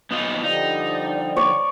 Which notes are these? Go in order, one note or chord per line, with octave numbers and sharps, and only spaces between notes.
B3 D#4 F4
D3 F3 G3 D#4 D5
C#5 D5